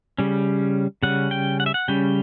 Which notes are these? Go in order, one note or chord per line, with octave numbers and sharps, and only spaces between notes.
C#3 G3 C#4
C#3 G3 C#4 F#5
G5
F#5
E5
F#5
C#3 G3 C#4 G5